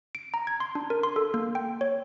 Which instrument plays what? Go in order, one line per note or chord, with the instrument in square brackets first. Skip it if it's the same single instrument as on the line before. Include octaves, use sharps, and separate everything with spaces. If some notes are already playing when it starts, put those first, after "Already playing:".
[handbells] D7
A#5
G#6
C6
D4
A#4
C6
A4
A#3
G5
C#5